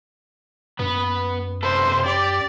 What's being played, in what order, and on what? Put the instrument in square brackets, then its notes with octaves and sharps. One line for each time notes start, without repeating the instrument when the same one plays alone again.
[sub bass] F#2 [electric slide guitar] B3 B4
[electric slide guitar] C3 A4 B4 [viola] C5
[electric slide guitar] G4 [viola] D5